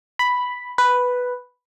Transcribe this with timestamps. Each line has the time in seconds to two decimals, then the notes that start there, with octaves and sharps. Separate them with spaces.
0.19 B5
0.78 B4